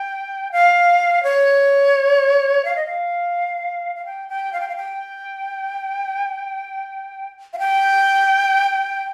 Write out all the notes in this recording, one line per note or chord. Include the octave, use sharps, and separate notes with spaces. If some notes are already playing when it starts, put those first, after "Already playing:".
Already playing: G5
F5
C#5
F5
D#5
F5
F5
G5
G5
F5
G5
F5
G5
F5
G5